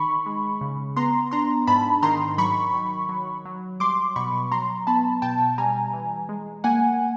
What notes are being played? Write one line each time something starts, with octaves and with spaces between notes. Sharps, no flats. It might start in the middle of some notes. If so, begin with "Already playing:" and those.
Already playing: D#3 D#4 B5 C#6
G#3
C#3
B3 A#5 C6
D4 A#5 C6
G#2 A5 B5
D#3 A#5 C6
F#3 B5 C#6
D#3
F#3
F#3
G3 C6 D6
B2 B5 C#6
F#3 A#5 C6
B3 A5 B5
B2 G5 A5
G3 G#5 A#5
E3
G#3
A#3 F#5 G#5